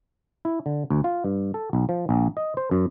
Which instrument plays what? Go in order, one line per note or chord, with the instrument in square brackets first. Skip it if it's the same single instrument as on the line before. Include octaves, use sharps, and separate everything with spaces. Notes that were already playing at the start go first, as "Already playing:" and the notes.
[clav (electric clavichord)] E4
D3
D2
F4
G2
A4
B1
F3
A#1
D#5
C5
F#2